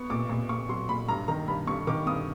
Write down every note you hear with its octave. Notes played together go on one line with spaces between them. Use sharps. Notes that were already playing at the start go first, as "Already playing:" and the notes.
Already playing: B3 C#6
A#2 D6
A#2 D6
A#2 C#6
F#3 C6
A#2 B5
G2 A#5
D#3 A#5
G2 B5
G2 C#6
D#3 D6
G2 D#6